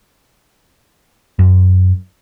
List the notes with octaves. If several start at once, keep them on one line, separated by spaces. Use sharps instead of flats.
F#2